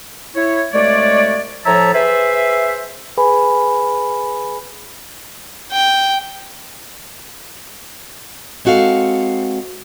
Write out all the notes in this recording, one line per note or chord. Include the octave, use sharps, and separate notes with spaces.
E4 C#5
C2 G#3 A3 C#5 D5
A2 F3 C#5 E5 A5 A#5
G#4 B4 C5 E5
G#4 B4 G#5 B5
G5
G#3 C4 F#4 A4 F5